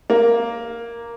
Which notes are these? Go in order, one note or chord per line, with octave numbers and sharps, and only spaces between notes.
A#3